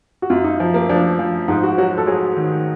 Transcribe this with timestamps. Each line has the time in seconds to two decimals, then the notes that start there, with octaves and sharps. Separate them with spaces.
0.22 F#4
0.30 F#2 F4
0.44 D#4
0.60 F3
0.74 A#3
0.89 F3 D4
1.19 F3
1.48 G#2 D#4
1.63 F#4
1.78 F#3 F#4
1.98 A4
2.07 F#3 G#4
2.37 D#3